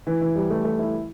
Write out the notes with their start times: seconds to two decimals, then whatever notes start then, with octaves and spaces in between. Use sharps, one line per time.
0.07 E3
0.21 E3
0.36 G3
0.50 A3
0.64 A3
0.79 E4